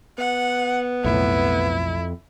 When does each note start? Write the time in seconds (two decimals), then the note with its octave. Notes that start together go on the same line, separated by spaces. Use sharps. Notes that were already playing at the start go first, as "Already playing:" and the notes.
0.18 B3 F#5
1.04 B1 F2 A2 E4